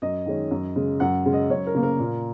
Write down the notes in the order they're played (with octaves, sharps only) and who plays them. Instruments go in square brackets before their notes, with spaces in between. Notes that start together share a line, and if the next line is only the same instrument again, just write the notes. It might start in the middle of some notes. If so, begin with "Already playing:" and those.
[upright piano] F#2 D#5
D#3 G#3 C#4
F#2
C#3 G#3
F#2 F#5
C#3 G#3
D#5
F#2 C#5
A#4
C#3 A#3
A#4
A#2